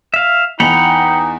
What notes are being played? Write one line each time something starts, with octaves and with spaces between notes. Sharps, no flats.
E5 F5
E2 D#4 F#5 G5 B5 F7